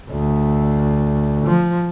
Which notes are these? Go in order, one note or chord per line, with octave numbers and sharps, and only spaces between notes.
D2
F3